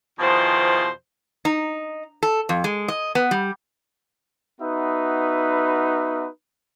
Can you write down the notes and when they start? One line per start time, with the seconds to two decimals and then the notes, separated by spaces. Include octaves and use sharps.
0.19 E2 B2 D#3 F3 C5
1.45 D#4
2.23 A4
2.49 F2
2.64 G#3
2.88 D#5
3.15 B3
3.31 G3
4.61 B3 D#4 F#4 B4 E5